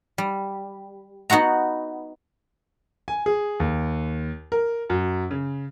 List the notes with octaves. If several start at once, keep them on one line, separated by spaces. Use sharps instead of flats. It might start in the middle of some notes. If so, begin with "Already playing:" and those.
G3
B3 D#4 F#4 F#5 A#5
G#5
G#4
D#2
A#4
F#2
C#3